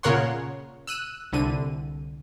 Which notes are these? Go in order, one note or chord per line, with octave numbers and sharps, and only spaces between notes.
A#2 C#3 A#4 C#5 F#5 C6
E6 F#6 D#7
C2 D3 D#7